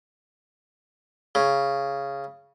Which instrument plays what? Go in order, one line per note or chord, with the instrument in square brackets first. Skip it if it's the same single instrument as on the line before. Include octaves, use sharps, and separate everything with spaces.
[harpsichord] C#3